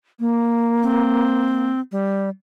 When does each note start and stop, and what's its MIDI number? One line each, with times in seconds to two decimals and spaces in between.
0.20 1.71 58
0.83 1.80 60
1.92 2.29 55